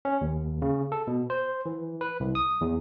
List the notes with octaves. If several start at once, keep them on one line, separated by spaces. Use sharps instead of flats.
C#4
D#2
C#3
A4
B2
C5
E3
B4
C2
D#6
E2